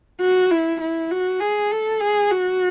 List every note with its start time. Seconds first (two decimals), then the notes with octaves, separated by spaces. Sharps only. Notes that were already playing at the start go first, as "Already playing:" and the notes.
0.21 F#4
0.51 E4
0.81 E4
1.11 F#4
1.40 G#4
1.71 A4
2.00 G#4
2.31 F#4